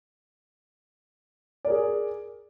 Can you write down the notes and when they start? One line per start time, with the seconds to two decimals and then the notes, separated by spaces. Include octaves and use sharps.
1.65 D5
1.67 A#4
1.70 G#4